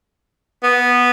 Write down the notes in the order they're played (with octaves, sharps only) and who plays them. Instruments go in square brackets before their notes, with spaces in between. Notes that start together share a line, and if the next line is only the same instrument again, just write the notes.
[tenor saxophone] B3